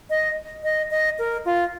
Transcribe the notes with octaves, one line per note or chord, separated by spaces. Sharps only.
D#5
D#5
D#5
A#4
F4